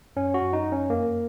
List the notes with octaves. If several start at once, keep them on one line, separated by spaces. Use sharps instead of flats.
F#2 C#4
F#4
F#2
D#4
F#2
C#4
F2 A#3